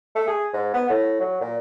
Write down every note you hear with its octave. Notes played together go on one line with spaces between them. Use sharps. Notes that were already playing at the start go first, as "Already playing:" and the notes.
A3
G#4
G#2
B3
A2
F#3
A#2